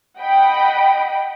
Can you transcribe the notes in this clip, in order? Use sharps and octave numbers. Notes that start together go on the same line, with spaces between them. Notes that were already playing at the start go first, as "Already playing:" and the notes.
D#5 F#5 G5 B5